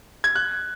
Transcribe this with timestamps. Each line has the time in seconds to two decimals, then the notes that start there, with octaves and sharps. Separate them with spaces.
0.24 G#6
0.35 F#6